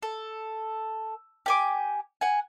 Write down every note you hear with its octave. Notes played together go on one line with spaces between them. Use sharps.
A4
G4 G#5 D6
F#5 G#5